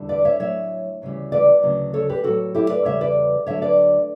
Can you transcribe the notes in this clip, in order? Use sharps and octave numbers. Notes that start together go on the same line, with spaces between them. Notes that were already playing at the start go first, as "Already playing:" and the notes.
Already playing: E2 D3 G3
B4 D5
C#5 E5
A2 F#3 C#5 E5
D2 C#3 E3 G3
B4 D5
D2 C#3 F#3
A4 C#5
G4 B4
A2 F#3 F#4 A4
E4 G4
B4 D5
E2 C#3 G3 C#5 E5
B4 D5
D2 D3 F#3 C#5 E5
B4 D5